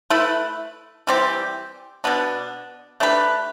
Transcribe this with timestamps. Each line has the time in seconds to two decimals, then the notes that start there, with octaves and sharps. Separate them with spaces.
0.10 A3 E4 B4
1.07 E3 G3 C4 G4
2.04 B2 B3 D4
3.00 A3 D4 G4 B4